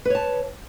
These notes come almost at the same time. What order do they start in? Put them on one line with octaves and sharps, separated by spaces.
B4 C#5 A5